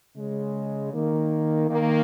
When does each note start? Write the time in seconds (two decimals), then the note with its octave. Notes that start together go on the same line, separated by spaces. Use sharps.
0.16 C#3 G#3
0.92 D#3 A#3
1.69 D#3 A#3